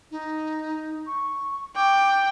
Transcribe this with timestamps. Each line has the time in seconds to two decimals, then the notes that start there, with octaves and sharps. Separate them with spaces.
0.11 D#4
1.07 C#6
1.76 G5 D6